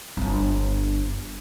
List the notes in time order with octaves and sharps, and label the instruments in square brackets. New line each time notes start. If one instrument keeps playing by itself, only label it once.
[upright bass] G1 G2